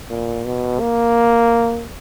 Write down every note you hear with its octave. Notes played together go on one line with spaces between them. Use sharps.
A#2
B2
A#3